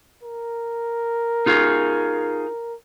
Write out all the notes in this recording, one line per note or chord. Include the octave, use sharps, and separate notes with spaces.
A#4
D#4 F4 G#4